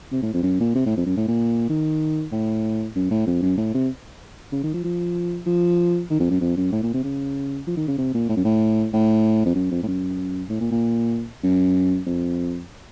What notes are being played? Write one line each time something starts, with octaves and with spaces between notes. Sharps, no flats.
C3
A2
F2
F#2
A#2
C3
A2
F2
F#2
A2
A#2
D#3
A2
F#2
A2
F2
F#2
A2
C3
C#3
D#3
F3
F3
F3
D#3
F2
F#2
F2
F#2
A2
A#2
C3
C#3
F3
D#3
C#3
C3
A#2
A2
F#2
A2
A2
F2
F#2
F2
A2
F#2
A2
A#2
A#2
F#2
F2